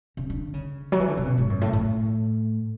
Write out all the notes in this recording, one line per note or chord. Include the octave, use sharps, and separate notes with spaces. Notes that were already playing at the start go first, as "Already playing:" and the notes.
C#3
D3
C#3
F#3
E3
D3
C#3
B2
G#2
F#2
A2
A2